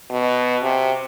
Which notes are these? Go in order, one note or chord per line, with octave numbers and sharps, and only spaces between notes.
B2
C3